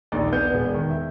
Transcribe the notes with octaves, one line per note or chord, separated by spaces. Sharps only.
A#1 D#2 D#4 D5
B3 G6
E1
D#3
E5